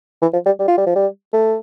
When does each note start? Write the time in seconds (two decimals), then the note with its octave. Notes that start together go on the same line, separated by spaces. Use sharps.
0.22 E3
0.33 F3
0.46 G3
0.59 G3
0.68 F4
0.78 G3
0.86 F3
0.95 G3
1.33 A3